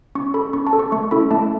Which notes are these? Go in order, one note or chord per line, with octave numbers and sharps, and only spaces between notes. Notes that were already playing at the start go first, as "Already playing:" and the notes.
C#4 C#6
A4 B5
C#4 C#6
A5
A4
C#6
A3 C#6
C#4 E4 A4 B5
A3 A5